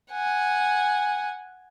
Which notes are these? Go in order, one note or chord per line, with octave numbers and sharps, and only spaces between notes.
F#5 G#5